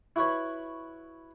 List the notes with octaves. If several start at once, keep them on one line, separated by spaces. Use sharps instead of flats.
E4 F#4 B4 C#5